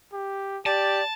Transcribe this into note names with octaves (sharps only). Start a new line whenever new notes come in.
G4
G4 D5 A5